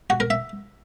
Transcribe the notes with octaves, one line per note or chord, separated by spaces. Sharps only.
F#4
A#4
E5